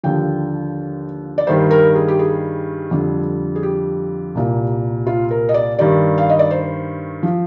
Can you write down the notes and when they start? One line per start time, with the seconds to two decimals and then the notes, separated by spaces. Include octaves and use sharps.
0.03 D#2 D3 F3 G5
1.38 D5
1.47 G2 D#3 G3 C5
1.71 A#4
1.95 G#4
2.08 G4
2.19 G#4
2.91 F2 D3 G3
3.56 G#4
3.63 G4
4.35 C2 A#2 G3
5.07 F4
5.31 A#4
5.49 D#5
5.54 D5
5.79 G2 D#3 G3 D5
6.18 F5
6.29 D#5
6.39 D5
6.51 C5
7.23 F3